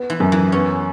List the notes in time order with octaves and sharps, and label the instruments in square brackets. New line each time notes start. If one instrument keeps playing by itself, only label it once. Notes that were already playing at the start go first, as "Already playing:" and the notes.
Already playing: [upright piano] B3
[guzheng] E3
[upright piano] F#2
[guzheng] E3
[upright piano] B3 [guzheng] C#4